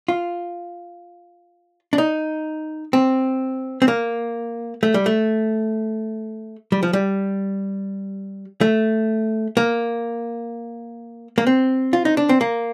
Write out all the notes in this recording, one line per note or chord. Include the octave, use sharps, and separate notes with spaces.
F4
D4
D#4
C4
C4
A#3
A3
G3
A3
G3
F3
G3
A3
A#3
A#3
C4
F4
D#4
D4
C4
A#3